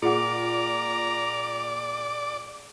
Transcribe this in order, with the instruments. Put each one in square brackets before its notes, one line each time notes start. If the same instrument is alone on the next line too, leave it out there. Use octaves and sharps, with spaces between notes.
[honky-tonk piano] A#2 D6 [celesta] G#4 F#5 [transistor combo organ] D5 [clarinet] A#5